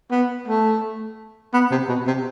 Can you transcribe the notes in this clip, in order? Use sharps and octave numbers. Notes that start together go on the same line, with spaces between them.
B3
A3
B3
C3
B2
C3